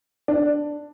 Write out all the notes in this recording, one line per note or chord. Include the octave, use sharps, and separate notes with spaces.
D4